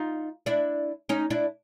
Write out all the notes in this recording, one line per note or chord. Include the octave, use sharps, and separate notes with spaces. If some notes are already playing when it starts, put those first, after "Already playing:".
Already playing: D#4 F4
D4 E4
C#4 D#4
D4 E4